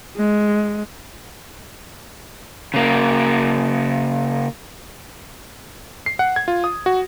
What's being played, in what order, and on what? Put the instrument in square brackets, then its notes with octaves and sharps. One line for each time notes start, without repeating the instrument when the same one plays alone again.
[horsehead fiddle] G#3
[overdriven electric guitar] C#3 A#3
[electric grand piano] C7
F#5
G#6
F4
D#6
F#4